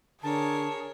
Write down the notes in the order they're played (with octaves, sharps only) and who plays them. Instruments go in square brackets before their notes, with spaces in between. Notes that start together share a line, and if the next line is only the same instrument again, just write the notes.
[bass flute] D3 [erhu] G#4 [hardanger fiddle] A#4 C#5 [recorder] A5